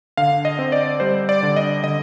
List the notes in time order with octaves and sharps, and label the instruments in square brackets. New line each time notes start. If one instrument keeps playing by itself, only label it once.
[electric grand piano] D3 F5
D#5
C4
D5
G3 C5
D5
D3
D#5
D3 D#5